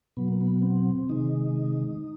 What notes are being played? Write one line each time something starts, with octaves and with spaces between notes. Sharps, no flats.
B2 F#3 B3
A#3
B3
C4
C3 D#3 G#3 D#4